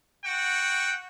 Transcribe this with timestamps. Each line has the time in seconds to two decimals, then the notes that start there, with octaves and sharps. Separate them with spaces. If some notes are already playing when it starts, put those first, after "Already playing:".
0.24 F#4 F#5 G5